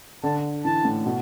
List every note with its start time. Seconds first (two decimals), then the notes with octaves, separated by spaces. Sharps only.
0.23 D3 A5
0.64 E3 A5
0.85 A2
1.06 B2